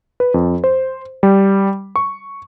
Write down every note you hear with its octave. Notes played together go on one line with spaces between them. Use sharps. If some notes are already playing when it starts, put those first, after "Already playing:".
B4
F2
C5
G3
C#6